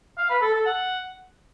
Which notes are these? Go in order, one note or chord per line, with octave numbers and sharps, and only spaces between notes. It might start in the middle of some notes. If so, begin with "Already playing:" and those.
F5
B4
A4
A4
F#5